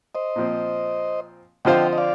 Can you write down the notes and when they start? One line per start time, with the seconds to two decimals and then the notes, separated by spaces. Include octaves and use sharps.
0.15 C5 D#5
0.36 A#2 F3 C4
1.65 D3 F3 C4 F4 C5 D#5 G5
1.93 D#5
1.98 D5 F5